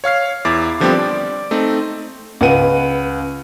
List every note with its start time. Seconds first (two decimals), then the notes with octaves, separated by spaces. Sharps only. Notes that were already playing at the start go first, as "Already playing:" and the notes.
0.04 C#5 F5 F6 C7
0.45 E2 E4 D6 A6
0.80 D3 F3 G3 B3 C4 G4
0.92 D5
1.51 A3 C4 D#4
2.41 C#2 B4 F#5 D#7